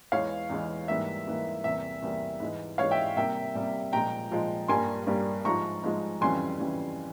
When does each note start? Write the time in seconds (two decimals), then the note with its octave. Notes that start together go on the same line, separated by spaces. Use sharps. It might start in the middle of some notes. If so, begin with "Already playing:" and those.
0.12 E2 E3 G#3 C#5 F5
0.50 E2 E3 G#3
0.88 G#2 E3 G3 A#3 E5
1.27 G#2 E3 G3 A#3
1.64 E2 C3 G3 A#3 E5
2.02 E2 C3 G3 A#3
2.40 G#2 E3 G#3
2.78 G#2 E3 G#3 C#5 F5
2.91 E5 G5
3.16 C3 G3 A#3 E5 G5
3.55 C3 G3 A#3
3.93 A#2 F3 G#3 G5 A#5
4.31 A#2 F3 G#3
4.68 G2 G3 A#3 G#5 C6
5.07 G2 G3 A#3
5.45 G#2 F3 G#3 A#5 C#6
5.83 G#2 F3 G#3
6.21 F2 C#3 E3 G3 G#5 C6
6.59 F2 C#3 E3 G3